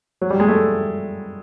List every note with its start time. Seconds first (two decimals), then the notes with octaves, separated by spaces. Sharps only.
0.22 F#3
0.30 G3
0.40 G#3
0.48 A3